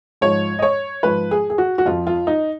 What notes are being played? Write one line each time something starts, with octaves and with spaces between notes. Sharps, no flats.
G#2 F3 C#5
D#5
C#5
G#2 F3 B4
G#4
G#4
F#4
F#4
F2 F3 F4
F4
D#4